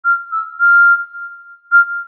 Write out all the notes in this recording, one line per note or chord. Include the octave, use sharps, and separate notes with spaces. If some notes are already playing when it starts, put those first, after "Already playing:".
F6
E6
F6
F6